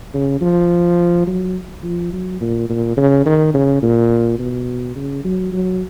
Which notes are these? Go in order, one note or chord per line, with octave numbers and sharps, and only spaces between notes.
C#3
F3
F#3
F3
F#3
A#2
A#2
C#3
D#3
C#3
A#2
B2
C#3
F#3
F#3